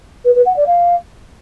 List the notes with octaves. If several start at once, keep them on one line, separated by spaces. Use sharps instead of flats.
B4
B4
F#5
D5
F5